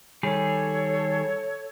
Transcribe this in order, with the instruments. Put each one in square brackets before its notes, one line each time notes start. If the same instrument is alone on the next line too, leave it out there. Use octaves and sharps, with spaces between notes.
[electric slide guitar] D#3 G3 G#4 [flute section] A4 C#5